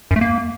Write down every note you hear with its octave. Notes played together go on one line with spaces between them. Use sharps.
F#2
A3
A#3